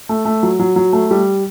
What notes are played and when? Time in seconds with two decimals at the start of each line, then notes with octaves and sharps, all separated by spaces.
0.09 A3
0.25 A3
0.43 F#3
0.60 F#3
0.76 F#3
0.93 A3
1.11 G3